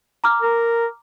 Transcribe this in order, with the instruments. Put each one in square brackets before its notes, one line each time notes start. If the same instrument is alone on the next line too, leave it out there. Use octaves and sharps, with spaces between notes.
[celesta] A#5 D6 F6
[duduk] A#4